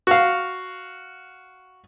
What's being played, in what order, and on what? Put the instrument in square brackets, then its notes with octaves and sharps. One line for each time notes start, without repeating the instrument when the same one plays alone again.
[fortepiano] F#4 F5